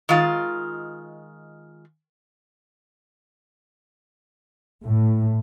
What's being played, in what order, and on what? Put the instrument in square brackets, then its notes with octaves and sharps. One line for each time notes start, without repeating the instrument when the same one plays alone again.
[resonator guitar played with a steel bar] D#3 G#3 F4
[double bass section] A2